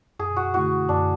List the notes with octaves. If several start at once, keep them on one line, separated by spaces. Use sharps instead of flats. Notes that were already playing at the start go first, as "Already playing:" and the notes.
F#2 G#4
F#4
D3 A3 E4 F#4
F#2 D4